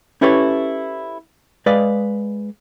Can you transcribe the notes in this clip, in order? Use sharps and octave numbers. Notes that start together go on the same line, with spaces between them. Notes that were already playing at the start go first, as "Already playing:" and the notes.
C#4 E4 G4 A4 B4 C#5
G#3 B4 D5 D#5 F5